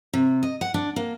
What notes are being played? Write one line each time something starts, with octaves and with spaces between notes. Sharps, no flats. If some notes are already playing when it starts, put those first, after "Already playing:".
C3
D#5
F#5
D4
A#3